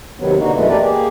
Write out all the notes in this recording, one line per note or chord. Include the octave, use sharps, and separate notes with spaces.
D#2 C3 D#3 F#3 B3
B2 D3 A#3 D#4 F#4
F#2 B2 E3 G#3 A3 B3
A3 D4 G4 A#4 B4 D5
A#3 G4 G#4